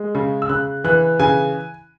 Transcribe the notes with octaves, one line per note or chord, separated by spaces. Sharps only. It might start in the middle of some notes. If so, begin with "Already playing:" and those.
Already playing: G#3
C#3
E6
C#3 F#6
E3 F#6
C#3 G#5